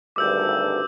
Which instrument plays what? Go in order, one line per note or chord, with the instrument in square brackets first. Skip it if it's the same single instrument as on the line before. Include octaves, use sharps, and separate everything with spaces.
[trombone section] G#1 D2 G2 [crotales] D6 E6 G6